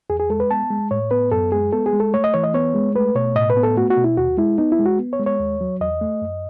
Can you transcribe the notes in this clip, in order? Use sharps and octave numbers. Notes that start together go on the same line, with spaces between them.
E2 G#4
G#4
G#3 A4
B4
B3 A5
G#3
A2 C#5
B3 B4
F#2 A4
G#3 G#4
B3 A4
G#4
G#3
A4
A3 C#5
D#5
E3 C#5
D#5
B3 C#5
G#3
A3 B4
B2 C#5
A2 D#5
B4
B3
A4
A3 F#4
F#4
B2
E4
D#2 F#4
G#3 E4
B3 D#4
E4
G#3
F#4
B3
C#5
G#3
C#5
D#2
F#3
E2 D#5
A3
F#2